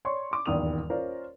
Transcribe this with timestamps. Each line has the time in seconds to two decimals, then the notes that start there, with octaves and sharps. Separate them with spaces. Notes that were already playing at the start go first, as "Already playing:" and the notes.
0.05 C#5 D5 C6 C#6
0.31 C#6 D6
0.46 D#1 E2 G2 D#3 D#6 F7
0.90 C#4 F4 A#4 C5 D5